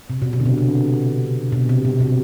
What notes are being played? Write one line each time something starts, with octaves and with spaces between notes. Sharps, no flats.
C3
B2
B2
D3
C3
C3
B2
C3
B2
C3